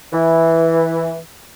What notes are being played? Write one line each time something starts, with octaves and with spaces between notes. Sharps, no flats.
E3